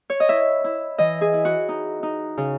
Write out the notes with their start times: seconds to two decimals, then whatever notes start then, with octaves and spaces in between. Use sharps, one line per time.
0.10 C#5
0.20 D#5
0.29 E4 E5
0.64 E4
0.98 E3 D#5
1.21 G#4
1.33 E4
1.45 F#4
1.69 D#4
2.03 D#4
2.37 C#3